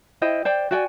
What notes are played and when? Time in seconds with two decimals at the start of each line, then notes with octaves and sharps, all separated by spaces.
0.22 E4 C5 D#5 G5
0.45 C5 D5 G5
0.71 F#4 D5 G5 G#5